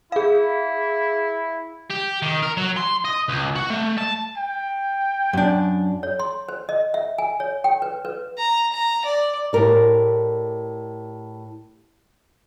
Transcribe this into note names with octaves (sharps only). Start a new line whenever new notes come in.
E4 G#4 F5
G4
D#3
A#4
F#3
C6
D#5
C#2
F#4
A3
A5
G5
F#2 D4
C#5
C6
C5
D#5
E5
G#5
C#5
G5
B4
B4
A#5
A#5
D5
A2 G4 A#4 D5